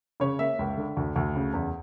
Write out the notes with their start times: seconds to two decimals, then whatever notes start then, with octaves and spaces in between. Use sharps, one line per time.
0.20 C#3 C#5
0.39 A#3 E5
0.59 C#2
0.77 D3
0.97 D2
1.16 D2
1.35 C#3
1.53 E2